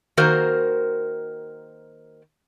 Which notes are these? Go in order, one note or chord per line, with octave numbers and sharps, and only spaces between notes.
D#3 A#3 F#4 A#4 C5